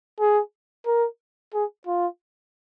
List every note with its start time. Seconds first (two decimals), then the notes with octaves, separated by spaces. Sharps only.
0.20 G#4
0.86 A#4
1.54 G#4
1.87 F4